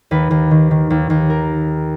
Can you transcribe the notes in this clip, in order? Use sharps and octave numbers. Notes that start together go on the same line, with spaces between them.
D#2 B4
D#2
D#3
D#3
D#2
D#2
A#4